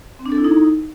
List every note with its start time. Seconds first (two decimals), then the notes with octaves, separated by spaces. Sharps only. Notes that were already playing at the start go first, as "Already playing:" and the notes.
0.19 C4
0.26 D4
0.32 A4
0.38 E4
0.44 D#4